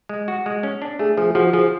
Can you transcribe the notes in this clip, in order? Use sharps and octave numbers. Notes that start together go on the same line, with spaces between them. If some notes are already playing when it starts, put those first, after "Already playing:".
G#3
F#4
G#3
C#4
D4
A3 G#4
F3 G#4
G#4
F3 F#4
F3 G#4